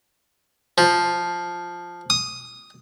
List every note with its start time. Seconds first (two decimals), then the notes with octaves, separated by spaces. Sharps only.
0.78 F3
2.10 D#6